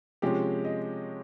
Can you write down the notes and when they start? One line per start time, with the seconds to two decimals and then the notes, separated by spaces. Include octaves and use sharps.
0.22 C3 F3 G#3 C#4 G4
0.65 D#5